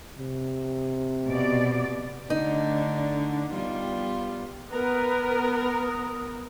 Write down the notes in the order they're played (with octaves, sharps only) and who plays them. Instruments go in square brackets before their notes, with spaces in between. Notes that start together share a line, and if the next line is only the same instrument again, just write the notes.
[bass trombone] C3
[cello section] B2 D5
[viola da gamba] D3 A3 D4 [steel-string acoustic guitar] D#4
[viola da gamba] G3 B3 F4
[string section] B3 A#4 [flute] B4
[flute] D#6